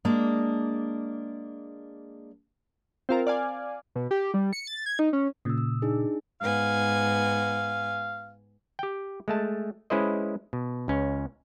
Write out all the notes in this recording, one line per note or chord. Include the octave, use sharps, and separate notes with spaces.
G#3 A#3 D4
C4 F4 A#4
D5 F5 G#5
B2
G4
G3
C#7
A6
G#6
D#4
C#4
A#2 C#3 D#6 E6
E6
D4 D#4 G#4
G#2 B3 F5 G#5
G4 G5
G#3 A3 A5
G#3 C#4 E4 B4 C5 D#5
B2
C#2 C#4